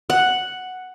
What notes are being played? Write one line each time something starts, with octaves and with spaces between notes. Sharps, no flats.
F#5